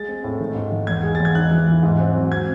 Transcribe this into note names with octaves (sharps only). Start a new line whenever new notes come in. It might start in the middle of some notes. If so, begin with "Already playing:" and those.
Already playing: G#3 A6
C4
A2
D#3
G#2
D#3
E2 G#6
G#3
E2 A6
G#6
D#4 F#6
E3
E3
G#2
C4
F#3
C4 G#6